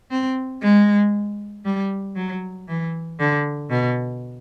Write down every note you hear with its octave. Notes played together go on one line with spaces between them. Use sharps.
C4
G#3
G3
F#3
E3
D3
B2